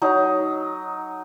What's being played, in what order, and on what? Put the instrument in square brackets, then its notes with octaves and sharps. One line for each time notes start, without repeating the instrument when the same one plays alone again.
[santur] F#3 D#4 D#5